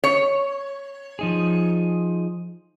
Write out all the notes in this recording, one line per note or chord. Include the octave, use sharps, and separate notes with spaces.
C#5
F3 D#4 G#4